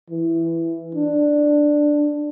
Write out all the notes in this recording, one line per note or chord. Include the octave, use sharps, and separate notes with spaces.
E3
D4